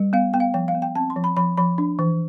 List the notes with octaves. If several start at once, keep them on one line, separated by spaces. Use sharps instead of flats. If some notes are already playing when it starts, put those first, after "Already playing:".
Already playing: G3
B3 F5
B3 G5
F5
F3 G5
F5
B3
G5
C4 A5
C6
F3
B5
F3 B5
F3 B5
D4
E3